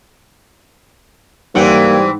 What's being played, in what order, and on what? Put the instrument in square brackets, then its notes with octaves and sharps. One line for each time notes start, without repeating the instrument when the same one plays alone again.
[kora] G#2 F#5 G5 [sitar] E3 C4 [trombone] G3 [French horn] A#3